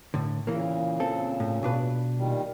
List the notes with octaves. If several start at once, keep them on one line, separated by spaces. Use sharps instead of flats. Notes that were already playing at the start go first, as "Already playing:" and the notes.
A2 D3
A#2 C#3 E3 A#3
C4 A4
A2
B2 D4 B4
A#2 D#3 G3